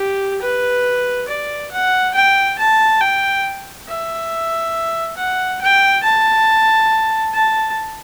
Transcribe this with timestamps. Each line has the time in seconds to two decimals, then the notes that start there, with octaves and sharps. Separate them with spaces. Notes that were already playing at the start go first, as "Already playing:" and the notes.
Already playing: G4
0.42 B4
1.28 D5
1.71 F#5
2.15 G5
2.58 A5
3.01 G5
3.88 E5
5.17 F#5
5.61 G5
6.03 A5
7.34 A5